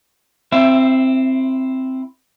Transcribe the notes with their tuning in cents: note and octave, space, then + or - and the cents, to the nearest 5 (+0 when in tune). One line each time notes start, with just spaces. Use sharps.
C4 +0 E4 +0 E5 +30